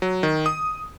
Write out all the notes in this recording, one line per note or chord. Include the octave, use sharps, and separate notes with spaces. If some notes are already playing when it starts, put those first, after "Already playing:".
F#3
D#3
D#6